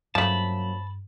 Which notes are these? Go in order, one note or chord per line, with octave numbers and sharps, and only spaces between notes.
G2 F3 F#3 A3 A#3 C#4 A5 B5